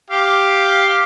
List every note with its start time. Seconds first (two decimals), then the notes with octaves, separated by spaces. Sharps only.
0.10 G4 F5